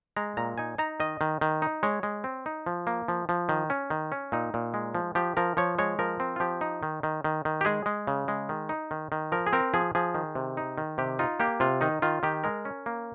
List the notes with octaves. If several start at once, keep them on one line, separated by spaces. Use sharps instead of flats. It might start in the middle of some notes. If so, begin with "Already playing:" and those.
G#3 A#5
A#2 A#5
D#4 G#5
D#4 A#5
D#3 D#5
D#3
D#3
D#4
G#3 C#5
G#3
C4
D#4
F3
A#3
F3
F3
D#3
C#4
D#3
C#4
A#2 D#4
A#2
G#3
F3
F3 G4
F3 A#4
F3 C#5
G#3 C#5
F3 A#4
C4
F4
F3 G4
D#4
D#3
D#3
D#3
D#3
G4
G#3 G#4
G#3
C#3
G#3
D#3
D#4
D#3
D#3
F3 A#4
G#4
C4 A#4
F3 G#4
F3 G#4
D#3
C3
D#4
D#3
C3 G4
D#4 F4
A#3 G4
C3 F4
D#3 D#4
D#3 F4
D#3 G4
G#3 A#4
C#4
A#3